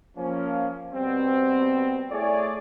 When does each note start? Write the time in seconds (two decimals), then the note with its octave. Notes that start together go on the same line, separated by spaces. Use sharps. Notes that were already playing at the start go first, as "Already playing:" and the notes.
0.17 F3 A#3 C#4
0.93 B2 G3 B3 C4
2.11 A3 E4 G#4 C#5 D5